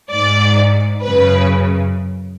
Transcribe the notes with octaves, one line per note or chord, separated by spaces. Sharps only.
G#2 D5
F#2 C#3 B4